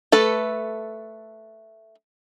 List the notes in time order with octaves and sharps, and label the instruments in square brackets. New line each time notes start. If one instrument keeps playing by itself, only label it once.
[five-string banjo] A3 A4 B4